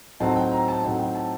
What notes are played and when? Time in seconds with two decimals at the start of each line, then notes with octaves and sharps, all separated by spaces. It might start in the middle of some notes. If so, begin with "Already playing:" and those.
0.20 A2 F#3 C4 D#4 A5
0.36 G5
0.52 A#5
0.68 A5
0.83 A2 F#3 C4 D#4 G5
0.99 G5
1.15 A5